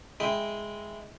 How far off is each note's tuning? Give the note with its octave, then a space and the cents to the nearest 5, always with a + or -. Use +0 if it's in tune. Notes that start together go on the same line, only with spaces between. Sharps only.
G#3 +0 E4 +0 G5 +0